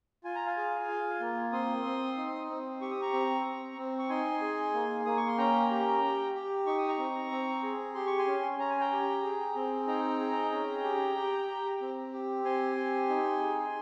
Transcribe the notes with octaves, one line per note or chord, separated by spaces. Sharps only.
F4 G#5
A#5
F5 G#5
G#4
F4
A#3
C4 C6 D#6
C4
D#4
C4
G4 C#6
D#6
A#5 C#6
C4
C4
C4
C#6
D#4 G#5 C6
G#4
A#3
A#3 D#6
C#6
C6
C#4 G5 A#5
G4
G4
G4
D#4 C#6
D#6
A#5 C#6
C4
C4
G#4
G4 C6
C#6
G#5 C6
C#4
C#4 A#5
G#5
G5 A#5
G4
G#4
C4
D#4 G5 A#5
G#4
C#4
G4
G4
G4
C4
G4
C4 G#5 C6
G4
D#4
G#4